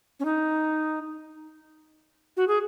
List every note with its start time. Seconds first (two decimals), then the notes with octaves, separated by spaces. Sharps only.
0.20 C#4
0.25 D#4
2.37 F#4
2.48 G#4